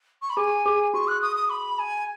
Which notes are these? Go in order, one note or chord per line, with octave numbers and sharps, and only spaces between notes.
C#6
B5
G#4 G#5
G#4
F#4 C#6
F#6
D#6
D#6
B5
G#5